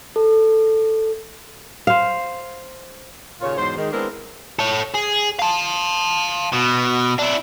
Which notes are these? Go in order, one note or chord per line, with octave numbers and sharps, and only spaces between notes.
A4
C5 F5
D#2 A#2 C#3 F4 C#5
E2 G#2 F#3 C5
D#3 G#3
G#3 B3 C4 D4 E4 A#4
A4 C#5
G#4
F5 A5
B2
D4 E4